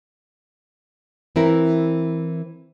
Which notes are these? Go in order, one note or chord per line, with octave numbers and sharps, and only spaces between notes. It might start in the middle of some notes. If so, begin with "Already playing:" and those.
E3 C4 E4 A#4